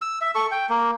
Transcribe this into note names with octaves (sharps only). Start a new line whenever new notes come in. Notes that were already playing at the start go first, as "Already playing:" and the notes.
E6
E5
A4 C#6
G5
A#3